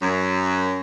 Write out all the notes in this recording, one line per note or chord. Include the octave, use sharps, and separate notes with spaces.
F#2